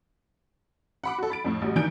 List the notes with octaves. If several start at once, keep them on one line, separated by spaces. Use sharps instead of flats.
F#5 B5 D6
F#4 A4
B5 A6 D7
F2 A2
A1 F#3 G3
D#3 E3 D4 G6 D7